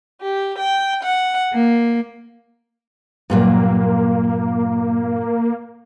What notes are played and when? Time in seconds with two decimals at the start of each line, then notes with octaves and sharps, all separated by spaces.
0.22 G4
0.58 G5
1.03 F#5
1.53 A#3
3.30 G2 A#2 F#3 A#3